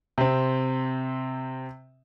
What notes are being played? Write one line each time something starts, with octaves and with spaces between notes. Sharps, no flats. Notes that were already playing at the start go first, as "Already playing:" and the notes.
C3 C4